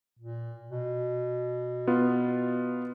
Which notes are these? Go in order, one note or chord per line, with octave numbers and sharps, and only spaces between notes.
A#2
B2
B3 F4